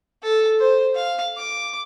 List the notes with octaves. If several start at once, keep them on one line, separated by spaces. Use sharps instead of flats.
A4
C5
F5
D6